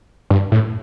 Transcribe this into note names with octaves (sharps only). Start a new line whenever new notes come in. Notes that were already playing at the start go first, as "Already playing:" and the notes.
G2
A2